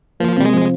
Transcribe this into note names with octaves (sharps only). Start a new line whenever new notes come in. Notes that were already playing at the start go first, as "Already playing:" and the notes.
F3 A#3
C3 G3
G#3
F3